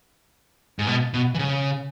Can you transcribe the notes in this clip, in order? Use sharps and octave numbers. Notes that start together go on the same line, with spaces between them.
G#2
B2
B2
E3
C#3